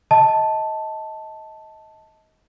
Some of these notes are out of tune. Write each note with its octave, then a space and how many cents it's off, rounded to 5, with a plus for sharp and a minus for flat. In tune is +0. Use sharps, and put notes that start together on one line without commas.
D#5 +25 A5 +0